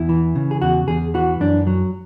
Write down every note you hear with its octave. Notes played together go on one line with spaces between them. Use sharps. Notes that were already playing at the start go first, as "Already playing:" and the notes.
Already playing: E2 E4
E3
C#3
G#4
E2 F#4
E2 G#4
E3 F#4
F#2 D4
F#3